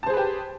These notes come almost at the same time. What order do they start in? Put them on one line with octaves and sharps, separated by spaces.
A5 C5 G#4 B4 G4